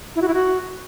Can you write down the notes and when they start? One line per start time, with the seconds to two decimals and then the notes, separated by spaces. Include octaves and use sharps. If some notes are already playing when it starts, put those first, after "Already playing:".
0.16 E4
0.22 F#4
0.28 E4
0.34 F#4